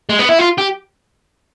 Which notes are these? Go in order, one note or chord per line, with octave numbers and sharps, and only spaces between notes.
G#3
B3
E4
F4
G4